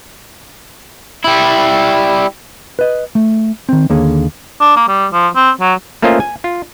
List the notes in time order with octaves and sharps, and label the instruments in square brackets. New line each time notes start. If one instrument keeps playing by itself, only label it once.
[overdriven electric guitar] G3 E4
[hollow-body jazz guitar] B4 D#5
A3
D#3 C4
D#2 D3 A#3 G#4 C#5
[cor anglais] D4
A#3
G3
F3
C4
F#3
[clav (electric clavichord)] A3 A#3 C#4 F4 C5 D#5
G#5
F4